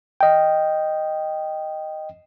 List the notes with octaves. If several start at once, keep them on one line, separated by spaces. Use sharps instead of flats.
D#5 G5